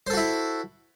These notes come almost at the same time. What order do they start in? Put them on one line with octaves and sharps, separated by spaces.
C5 A4 F#4 E4